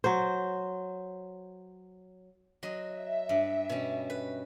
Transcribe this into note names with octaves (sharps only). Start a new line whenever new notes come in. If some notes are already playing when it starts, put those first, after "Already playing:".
F#3 C5
F#3 D#5 C6
E5
G2
B2 C#4
B4